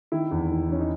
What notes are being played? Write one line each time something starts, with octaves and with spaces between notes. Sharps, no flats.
D#3 E4
E2
D#3
D#3 C#4
D#4